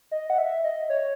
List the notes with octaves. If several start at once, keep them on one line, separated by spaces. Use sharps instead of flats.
D#5
F#5
E5
D#5
C#5